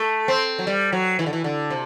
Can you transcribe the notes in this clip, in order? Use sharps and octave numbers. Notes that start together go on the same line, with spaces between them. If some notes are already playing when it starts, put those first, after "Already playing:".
Already playing: A3
C4
F#3
G3
F#3
E3
D3
E3
D3
C3